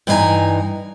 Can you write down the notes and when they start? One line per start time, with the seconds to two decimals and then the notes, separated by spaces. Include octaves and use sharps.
0.07 G2 E3 D#4 F4 G#5 A#5